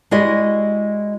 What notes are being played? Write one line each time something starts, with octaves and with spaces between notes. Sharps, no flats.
G#3 E4 F#4 G4 D5 D#5